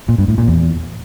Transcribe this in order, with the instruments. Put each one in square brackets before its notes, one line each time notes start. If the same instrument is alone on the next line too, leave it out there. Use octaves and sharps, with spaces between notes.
[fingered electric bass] A#2
G2
A2
A#2
E2